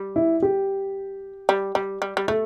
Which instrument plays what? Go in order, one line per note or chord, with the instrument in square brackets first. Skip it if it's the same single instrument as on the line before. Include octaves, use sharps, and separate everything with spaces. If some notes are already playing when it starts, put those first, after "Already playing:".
Already playing: [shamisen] G3
[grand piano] E4
G4
[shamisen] G3
G3
G3
G3
[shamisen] A3 [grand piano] A4